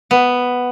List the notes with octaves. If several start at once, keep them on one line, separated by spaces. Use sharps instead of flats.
B3